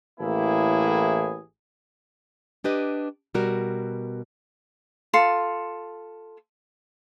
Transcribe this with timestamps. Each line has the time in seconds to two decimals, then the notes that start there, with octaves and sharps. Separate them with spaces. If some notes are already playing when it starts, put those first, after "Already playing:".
0.20 A1 A2 A#3 E4 G#4
2.64 D4 G4 B4 D#5
3.34 B2 G3 F#4 A#4
5.14 F4 A4 C6